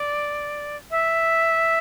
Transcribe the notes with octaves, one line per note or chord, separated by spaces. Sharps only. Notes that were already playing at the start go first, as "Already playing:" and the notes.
Already playing: D5
E5